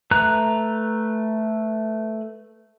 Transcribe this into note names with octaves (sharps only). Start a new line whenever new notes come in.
A3 B4 A#5 F#6